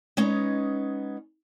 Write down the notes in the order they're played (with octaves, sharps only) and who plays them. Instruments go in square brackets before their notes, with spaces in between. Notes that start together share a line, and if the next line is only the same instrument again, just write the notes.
[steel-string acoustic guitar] G#3 B3 C#4 D#4